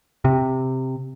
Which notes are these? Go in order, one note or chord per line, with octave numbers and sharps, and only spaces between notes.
C3